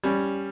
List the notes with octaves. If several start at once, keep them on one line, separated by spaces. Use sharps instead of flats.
G3 C#4